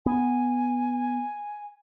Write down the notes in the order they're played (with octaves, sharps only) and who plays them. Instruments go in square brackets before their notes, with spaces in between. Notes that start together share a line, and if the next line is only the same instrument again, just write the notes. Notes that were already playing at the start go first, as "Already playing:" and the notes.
[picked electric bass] B3 [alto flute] G#5